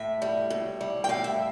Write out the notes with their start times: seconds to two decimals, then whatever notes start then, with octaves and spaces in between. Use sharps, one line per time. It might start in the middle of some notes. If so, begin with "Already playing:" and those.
Already playing: A2 E5
0.22 G3
0.50 A2
0.81 G3
1.04 G5
1.09 A2 F5
1.24 E5